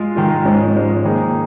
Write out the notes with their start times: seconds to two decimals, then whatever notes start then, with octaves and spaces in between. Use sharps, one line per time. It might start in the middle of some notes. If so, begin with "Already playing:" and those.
Already playing: G#3 F4
0.15 D#3 G#3 F4
0.45 G#2 F3 G#3 C#4
0.75 G#2 F3 G#3 C#4
1.04 D#3 A#3 D#4 G#4